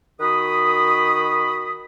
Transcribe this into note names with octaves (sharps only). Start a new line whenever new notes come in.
D#3 F#4 B5 D#6